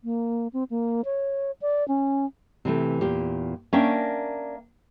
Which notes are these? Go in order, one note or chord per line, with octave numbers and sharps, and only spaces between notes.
A#3
C4
A#3
C#5
D5
C#4
C3 E3 A3
E2 A#2 G4
A#3 C#4 D4 A#4 E5 G5